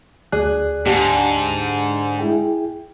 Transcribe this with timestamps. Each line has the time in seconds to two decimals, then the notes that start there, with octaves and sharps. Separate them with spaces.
0.32 D2 G#4 D5 F#6
0.86 G#2 D3 D4 G4
2.19 E4 G#4 G5